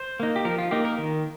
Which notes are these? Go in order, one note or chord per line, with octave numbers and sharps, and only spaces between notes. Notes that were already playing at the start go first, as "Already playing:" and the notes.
Already playing: C5
A#3 D#4
G4
F3 A#4
F4
A#3 D#4 G4
A#4
D#3